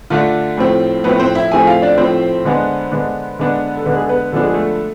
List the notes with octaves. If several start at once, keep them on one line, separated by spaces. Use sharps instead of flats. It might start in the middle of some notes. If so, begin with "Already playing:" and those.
D3 A3 D4 F4
A2 F3 A3 C4
A2 F3 A3 B3 C4 B4
C4 C5
E4 E5
A2 F3 A3 C4 G#4 G#5
F4 F5
D4 D5
A2 F3 A3 C4 C5
D3 G#3 B3 D4
D3 G#3 B3 D4
D3 G#3 B3 D4
A4
D3 G#3 B3 D4 B4
G#4
A4
B3 B4
D3 F3 G#3 B3 D4 A4
G#4
A3 A4